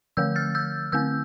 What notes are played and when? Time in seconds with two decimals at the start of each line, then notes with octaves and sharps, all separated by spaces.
0.17 D3 F3 A3 E6 G6
0.36 F6 A6
0.55 E6 G6
0.92 D3 A3 C4 E6 G6